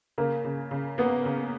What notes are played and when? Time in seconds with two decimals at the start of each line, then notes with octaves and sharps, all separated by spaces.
0.18 C#3 A#3
0.44 C#3
0.71 C#3
0.98 A#3 B3
1.25 C#3